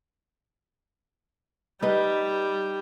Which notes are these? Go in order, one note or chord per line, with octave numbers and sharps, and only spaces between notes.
G3 D#4 B4